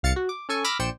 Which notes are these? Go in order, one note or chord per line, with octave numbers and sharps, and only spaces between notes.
C2 F5 A6 C#7
F#4
D6
C#4 A4 G#5 C#6
B5 D6 E6 F6 A#6 B6
A#1 C5 D5 G5 C#7 E7